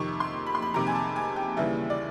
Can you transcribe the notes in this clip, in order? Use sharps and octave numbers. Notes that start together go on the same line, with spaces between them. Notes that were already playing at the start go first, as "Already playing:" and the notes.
Already playing: F2 C3 D#3 C#6
C6
B5
C6
B5
F2 C3 D#3 A#5
G#5
A5
G#5
G5
D#2 C#3 E3 G3 E5
D5